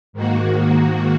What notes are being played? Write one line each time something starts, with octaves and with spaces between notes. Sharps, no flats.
G#2 D#3 A#3 F#4